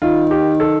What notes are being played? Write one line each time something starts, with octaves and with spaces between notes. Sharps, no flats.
D#3 F4
G4
A4